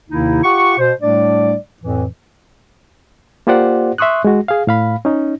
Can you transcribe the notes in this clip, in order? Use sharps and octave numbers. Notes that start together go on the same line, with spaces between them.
D#2 C3 D#3 A#3 D#4 E4
F4 G4 F#5 C#6
B2 C5
A2 G3 A3 D4 D5
F2 A2 E3
A#3 F4 G4 C5 D5 F#5
E5 C6 C#6 D#6 F#6
G#3 F#4
G#4 F5
A2 F5 B5
C#4 D#4